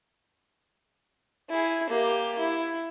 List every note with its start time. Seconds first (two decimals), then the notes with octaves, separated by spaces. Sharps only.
1.49 E4 G#4
1.90 A#3 G4
2.39 E4